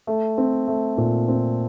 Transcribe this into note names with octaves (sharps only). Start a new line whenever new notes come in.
A3
C4
A3
A#2
C4